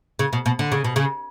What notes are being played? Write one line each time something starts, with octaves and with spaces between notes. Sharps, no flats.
C#3
B2
B2
D3
C#3
B2
C#3